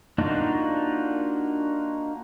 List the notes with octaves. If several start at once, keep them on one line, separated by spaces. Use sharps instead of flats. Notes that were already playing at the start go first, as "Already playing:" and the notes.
A#3 D4 D#4 F4 F#4